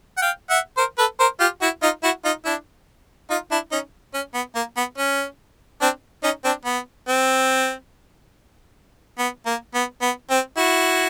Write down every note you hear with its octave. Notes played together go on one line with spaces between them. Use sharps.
F#5
F5 G5
E5 F#5
A#4 C5
A4 B4
A#4 C5
F4 G4
E4 F#4
D#4 F4
E4 F#4
D#4 F4
D4 E4
D#4 F4
D4 E4
C#4 D#4
C#4
B3
A#3
B3
C#4
C4 D4
C#4 D#4
C4 D4
B3
C4
B3
A#3
B3
B3
C4
E4 F#4